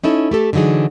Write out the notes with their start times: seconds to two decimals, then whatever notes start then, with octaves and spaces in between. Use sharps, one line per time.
0.04 C#4 D#4 E4 A4
0.31 A3 G4 A4
0.53 D3 E3 F#3 D#4 G#4